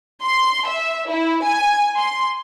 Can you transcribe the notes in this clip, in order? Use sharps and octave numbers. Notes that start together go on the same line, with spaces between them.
C6
E5
E4
G#5
C6